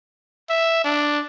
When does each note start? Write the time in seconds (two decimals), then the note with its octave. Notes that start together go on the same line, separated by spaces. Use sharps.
0.50 E5
0.85 D4